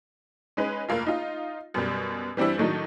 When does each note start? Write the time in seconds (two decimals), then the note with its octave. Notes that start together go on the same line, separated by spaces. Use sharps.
0.57 G#3 C#4 D#4 B4
0.89 F1 A#3 F4
1.07 D#4 F4
1.74 F#2 B2 G3
2.37 E3 G3 C4 D4 E4
2.58 A2 D#3 F#3 A3 D4 D#4